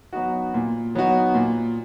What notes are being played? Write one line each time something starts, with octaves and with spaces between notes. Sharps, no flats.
F#3 B3 D#4 F#4
A#2
F#3 B3 D#4 F#4
A#2